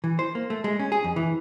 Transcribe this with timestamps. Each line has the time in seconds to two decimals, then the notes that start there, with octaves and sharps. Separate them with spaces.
0.04 E3
0.19 C5
0.35 A#3
0.50 A3
0.64 G#3
0.79 C#4
0.92 G#4
1.04 F2
1.16 E3